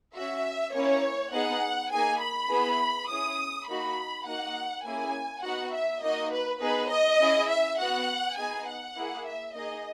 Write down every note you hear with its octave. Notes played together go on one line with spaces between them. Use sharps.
C#4 F#4 E5
A#3 C#4 E4 C#5
B3 D#4 G#4 F#5
A#3 D#4 G#4 G#5
B5
B3 E4 G#4
C#4 E4 G#4 D#6
A#3 D#4 F#4 B5
A#3 D#4 F#4 F#5
A#3 C#4 E4 G#4 G#5
B3 D#4 F#4 F#5
E5
A#3 D#4 F#4 D#5
B4
B3 D#4 G#4 B4
D#5
C#4 E4 G#4
E5
B3 F#4 F#5
B3 D#4 G#4 G#5
F#5
A#3 E4 G#4
E5
A#3 D#4 G#4 D#5